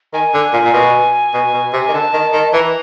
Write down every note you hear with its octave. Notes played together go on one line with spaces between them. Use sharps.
D#3 G#5
D3
A#2
A#2
B2
B2
B2
C3
G#5
D#3
D3 A5
D#3
D#3
E3 A#5